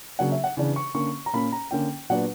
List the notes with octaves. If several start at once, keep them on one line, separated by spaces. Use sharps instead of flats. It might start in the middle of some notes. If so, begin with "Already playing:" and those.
C#3 F#3 A#3 D4 F#5
E5
F#5
C#3 E3 B3 D4
C#6
D3 A#3 C#4 C#6
A#5
A#2 A#3 C#4 B5
A#5
D3 A#3 C#4 G5
A#2 F#3 B3 D4 F#5